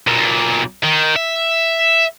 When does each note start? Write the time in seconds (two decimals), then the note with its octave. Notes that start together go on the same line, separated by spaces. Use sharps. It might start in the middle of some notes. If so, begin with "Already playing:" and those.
0.07 B1 A#2
0.83 D#3
1.16 E5